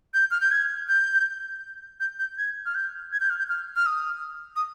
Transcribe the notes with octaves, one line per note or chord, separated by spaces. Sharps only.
G6
F6
G6
G#6
G6
G6
G6
G#6
F6
G6
G#6
G6
F6
G6
F6
F6
D#6
D#6